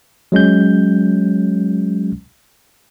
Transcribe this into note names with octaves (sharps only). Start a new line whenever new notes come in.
F#3 G#3 C#4 G6